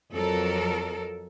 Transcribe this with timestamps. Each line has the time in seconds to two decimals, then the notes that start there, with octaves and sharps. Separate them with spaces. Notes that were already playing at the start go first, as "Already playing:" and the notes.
0.12 F2 F#3 A4 A#4